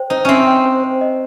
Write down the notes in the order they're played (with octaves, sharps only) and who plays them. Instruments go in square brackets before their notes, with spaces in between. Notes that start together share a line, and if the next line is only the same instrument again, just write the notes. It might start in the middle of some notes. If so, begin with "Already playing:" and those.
Already playing: [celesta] C5 G5
[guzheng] D#4 [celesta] C5
[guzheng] C4 C#4 [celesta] E5
[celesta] G5
C5
C5
D#5